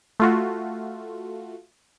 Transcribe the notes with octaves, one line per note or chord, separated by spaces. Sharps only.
A3 F4 F#4